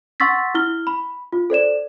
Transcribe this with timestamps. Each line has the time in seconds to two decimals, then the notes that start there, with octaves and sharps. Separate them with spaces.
0.20 F#5 C6 C#6 E6 A6 B6
0.55 E4 F6 G7
0.87 B5
1.32 F4
1.50 A4 C5 D5 E7